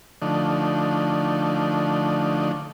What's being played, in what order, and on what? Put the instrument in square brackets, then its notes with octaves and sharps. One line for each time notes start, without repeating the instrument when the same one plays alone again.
[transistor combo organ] D3 F3 A3 D4 D#4